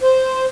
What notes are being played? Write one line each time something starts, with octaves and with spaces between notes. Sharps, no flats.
C5